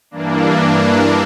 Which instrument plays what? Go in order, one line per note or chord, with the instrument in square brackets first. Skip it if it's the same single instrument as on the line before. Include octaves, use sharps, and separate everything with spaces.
[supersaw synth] G2 E3 A#3 D4